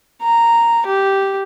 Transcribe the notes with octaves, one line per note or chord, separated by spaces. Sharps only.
A#5
G4